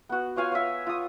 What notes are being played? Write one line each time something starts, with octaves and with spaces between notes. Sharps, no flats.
B3 F#4
F4 C#5 F5 G#5
C#5 E5
F4 D#6